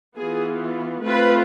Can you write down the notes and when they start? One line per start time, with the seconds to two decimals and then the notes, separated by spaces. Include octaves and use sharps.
0.16 E3 B3 F4 G#4
1.01 A3 C4 F4 B4